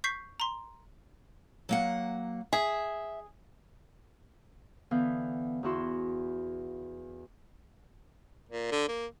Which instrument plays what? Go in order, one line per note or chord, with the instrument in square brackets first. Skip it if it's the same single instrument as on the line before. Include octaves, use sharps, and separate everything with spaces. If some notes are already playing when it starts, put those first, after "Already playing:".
[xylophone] C#6 G6 B6 C7
A#5 C6
[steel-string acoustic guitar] F#3 A#3 F#5
[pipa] G#4 [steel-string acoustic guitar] E5
[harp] D3 E3 B3 F5 G6
E2 E3 E4 F#4 C6 E6
[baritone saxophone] A#2
D3
A#3